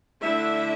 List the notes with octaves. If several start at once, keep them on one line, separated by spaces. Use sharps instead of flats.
D3 A3 D4 E4 E5